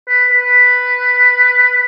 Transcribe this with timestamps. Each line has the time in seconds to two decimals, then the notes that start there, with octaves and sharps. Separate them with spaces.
0.08 B4
0.31 B4